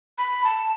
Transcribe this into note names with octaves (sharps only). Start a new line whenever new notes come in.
B5
A5